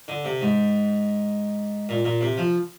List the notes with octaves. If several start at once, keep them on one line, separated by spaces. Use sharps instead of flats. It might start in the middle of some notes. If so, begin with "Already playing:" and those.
D3
C3
G#2
A#2
A#2
C3
F3